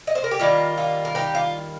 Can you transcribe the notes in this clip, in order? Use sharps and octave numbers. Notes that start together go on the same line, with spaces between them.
D#5
C5
A#4
G4
D#3 G3 A#3 F4
F4
A#4
D#4 G4
F4